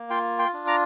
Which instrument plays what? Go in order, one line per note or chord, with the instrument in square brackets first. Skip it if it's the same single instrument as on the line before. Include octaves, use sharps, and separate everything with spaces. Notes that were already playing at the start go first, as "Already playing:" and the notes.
Already playing: [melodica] A#3
F4 G5 C6
G5 C6
D4
A#5 D6